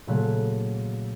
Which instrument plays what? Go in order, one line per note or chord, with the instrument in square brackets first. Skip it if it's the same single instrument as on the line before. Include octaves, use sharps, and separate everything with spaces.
[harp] A#2 C#3 F#3 A3 F#6